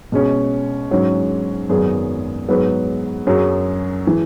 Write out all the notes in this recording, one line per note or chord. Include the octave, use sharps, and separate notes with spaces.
B2 G#3 C#4
G#2 F#3 C#4
G#1 F#2 F#3 B3 G#4
G#2 F#3 B3 G#4 B4
F#2 F#3 C#4 G#4
E3 G#3